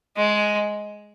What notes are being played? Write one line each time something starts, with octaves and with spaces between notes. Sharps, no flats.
G#3